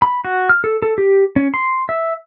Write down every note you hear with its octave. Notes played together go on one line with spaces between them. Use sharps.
B5
F#4
F6
A4
A4
G4
C#4
C6
E5